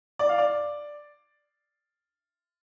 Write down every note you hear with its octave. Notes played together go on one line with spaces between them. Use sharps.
D5
F5
D5